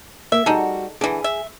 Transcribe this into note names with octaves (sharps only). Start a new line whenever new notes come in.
A#3 E5
G3 D#4 F#4 G#4 A4
D3 E3 G#4
E5